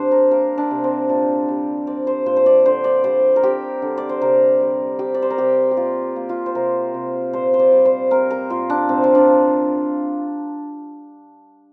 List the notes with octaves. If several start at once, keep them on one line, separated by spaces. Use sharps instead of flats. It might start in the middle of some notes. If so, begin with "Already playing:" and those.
Already playing: C3 G3 D4 C5
A#4
A#3 A#4
D4
C3
C4
A#2 D4
G3
C4 D5
C5
A#2 C5
C5
D5
D3 C5
D5
G3 C5
A#4
C4 G4
D3
D5
C5
C3 A#4
G3
C4 G4
D5
C5
A#4
C3 G4
G4
A#3 F4
A#3
F4
C5
C3 A#4
C3
A#2 C5
C5
D5
G3
C5
C4 A#4
A#4
A#2 F4
D4
C3 C4
F4
D4
F3